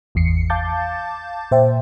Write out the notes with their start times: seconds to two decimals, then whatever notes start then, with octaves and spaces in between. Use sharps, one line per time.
0.15 G#1 E2 C7 C#7
0.50 F5 A5 D6 G6 A6
1.51 A#2 C5 E5 G5